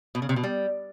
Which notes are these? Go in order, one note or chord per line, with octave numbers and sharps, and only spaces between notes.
B2
C#3
C3
B2
G3